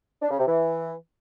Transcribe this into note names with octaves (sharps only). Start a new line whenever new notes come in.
D4
C#3
C3
E3